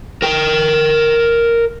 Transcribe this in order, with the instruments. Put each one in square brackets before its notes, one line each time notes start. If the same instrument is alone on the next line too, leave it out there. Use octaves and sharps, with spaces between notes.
[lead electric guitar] A#4 G5